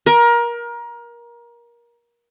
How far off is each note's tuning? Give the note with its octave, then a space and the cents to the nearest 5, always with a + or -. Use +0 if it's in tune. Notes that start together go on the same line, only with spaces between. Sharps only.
A#4 +25